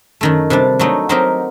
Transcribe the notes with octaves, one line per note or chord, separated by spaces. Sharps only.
F#2 D#3 A3
C3 G3 D4
F#3 A3 D#4
F#3 C4 D#4 G4 A#4